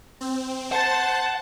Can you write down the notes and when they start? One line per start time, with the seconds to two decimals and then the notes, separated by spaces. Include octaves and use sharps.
0.21 C4
0.72 C5 F#5 A5